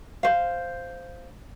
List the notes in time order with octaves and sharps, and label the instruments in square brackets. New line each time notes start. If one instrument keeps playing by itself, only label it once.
[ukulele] C5 F5